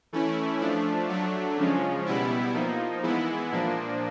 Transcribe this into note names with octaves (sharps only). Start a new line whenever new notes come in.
E3 A3 C#4 E4
F3 A3 D4
F#3 A3 D4
C#3 F3 G#3 C#4
B2 G3 B3 E4
F3 A#3 D#4
E3 G#3 B3 E4
A#2 F3 A#3 D4